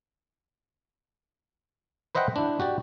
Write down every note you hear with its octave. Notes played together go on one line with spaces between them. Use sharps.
B4 C5 D#5 E5 F#5 G5
D4 E4
F#4 G4 D5